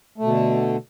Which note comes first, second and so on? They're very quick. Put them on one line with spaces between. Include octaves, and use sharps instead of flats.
A3 B2 D3